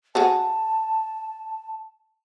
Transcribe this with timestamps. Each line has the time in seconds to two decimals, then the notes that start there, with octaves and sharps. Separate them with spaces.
0.15 F#4 G#4 A4 A5